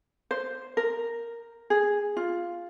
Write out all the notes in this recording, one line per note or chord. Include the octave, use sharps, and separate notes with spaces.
C5
A#4
G#4
F4